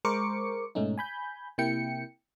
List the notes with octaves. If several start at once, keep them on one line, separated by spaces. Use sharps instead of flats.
G#3 A#4 C5 C#6 D6 C#7
G#2 B2 A3 C#4 D#4
G#5 B5 G6
C3 A#3 E4 G5 C#7